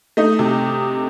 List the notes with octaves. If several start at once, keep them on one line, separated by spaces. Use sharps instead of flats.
A3 D#4
C3